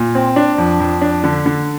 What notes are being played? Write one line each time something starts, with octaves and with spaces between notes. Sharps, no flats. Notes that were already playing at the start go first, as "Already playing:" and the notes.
Already playing: A#2
C4
D4
F2
F2
D4
D3
D3